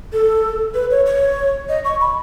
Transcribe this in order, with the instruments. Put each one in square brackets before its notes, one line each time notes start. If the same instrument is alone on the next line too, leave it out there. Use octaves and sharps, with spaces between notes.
[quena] A4
B4
C#5
C#5
D#5
C#6
B5